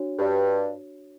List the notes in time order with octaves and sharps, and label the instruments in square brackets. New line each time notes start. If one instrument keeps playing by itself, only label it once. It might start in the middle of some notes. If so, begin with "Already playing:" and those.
Already playing: [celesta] D4 F#4 C#5
[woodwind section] G2